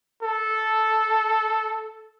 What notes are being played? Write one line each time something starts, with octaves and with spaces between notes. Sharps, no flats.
A4